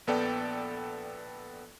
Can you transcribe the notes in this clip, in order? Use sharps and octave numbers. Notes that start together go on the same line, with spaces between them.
A#1 B3 A4 D5 G5